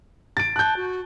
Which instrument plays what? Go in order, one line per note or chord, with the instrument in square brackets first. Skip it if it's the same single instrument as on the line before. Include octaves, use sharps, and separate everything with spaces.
[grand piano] A6 D7
[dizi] A5 [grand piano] F#6 G6
[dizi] F#4